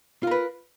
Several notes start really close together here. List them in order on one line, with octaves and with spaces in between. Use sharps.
F4 A#4 B4